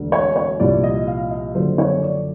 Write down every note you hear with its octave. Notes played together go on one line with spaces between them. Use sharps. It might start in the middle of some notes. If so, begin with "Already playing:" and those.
Already playing: E1 D2 D3
C#5
C#5
C2 A#2 F3 D5
D#5
F5
D#5
F#1 F#2 D3 F3 C5
C#5
D5